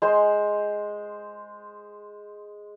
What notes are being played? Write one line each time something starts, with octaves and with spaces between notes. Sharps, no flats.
G#3 C5 C6